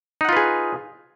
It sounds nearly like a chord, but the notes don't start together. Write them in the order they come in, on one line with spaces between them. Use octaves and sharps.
D#4 F#5 F4 B4 G#4